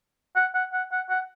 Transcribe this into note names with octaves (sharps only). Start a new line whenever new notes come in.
F#5
F#5
F#5
F#5
F#5